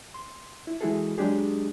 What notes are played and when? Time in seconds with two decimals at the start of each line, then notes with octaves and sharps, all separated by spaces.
0.14 C6
0.67 E4
0.81 E3 G#3 E4 F#4 G#4 A4
1.18 F#3 G#3 D4 G4 G#4